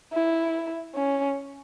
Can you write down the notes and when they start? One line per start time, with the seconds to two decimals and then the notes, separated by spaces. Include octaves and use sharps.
0.13 E4
0.95 C#4